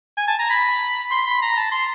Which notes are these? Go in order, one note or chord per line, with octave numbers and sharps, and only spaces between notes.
G#5
A5
A#5
B5
C6
B5
A#5
A5
C6